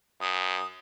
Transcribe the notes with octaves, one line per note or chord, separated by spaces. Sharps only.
F#2 D#6